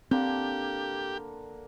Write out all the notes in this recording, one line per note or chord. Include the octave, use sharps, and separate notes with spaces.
D3 A#3 C4 G4